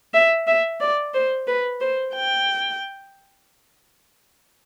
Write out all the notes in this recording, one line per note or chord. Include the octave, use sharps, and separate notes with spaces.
E5
E5
D5
C5
B4
C5
G5